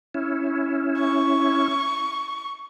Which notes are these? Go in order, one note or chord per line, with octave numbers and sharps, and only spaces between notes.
C#4 E4
C#6